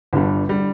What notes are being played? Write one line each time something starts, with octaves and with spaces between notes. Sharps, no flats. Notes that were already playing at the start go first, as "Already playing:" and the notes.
G1 G2 D3 G3
D3 G3